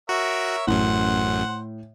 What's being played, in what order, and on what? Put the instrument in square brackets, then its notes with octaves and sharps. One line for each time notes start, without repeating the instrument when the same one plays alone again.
[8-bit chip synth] F#4 [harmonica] A#4 C#5 E5
[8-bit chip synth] A1 F#2 [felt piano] A2 [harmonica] C5 F#5